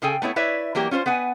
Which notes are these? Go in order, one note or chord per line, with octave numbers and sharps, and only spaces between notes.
C#3 G#4 A4 G5 G#5
A3 B3 E4 C#5
E4 B4 C#5 D5 E5
E3 F#3 A#3 G4 A#4
C#4 F4 G4 C5
B3 B4 F#5 G#5